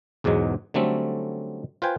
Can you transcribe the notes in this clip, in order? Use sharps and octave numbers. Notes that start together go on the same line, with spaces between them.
B1 E2 G#2 B2 F#3 G#3
D3 F#3 G3 A3 C4 C#4
F4 B4 C5 G5 G#5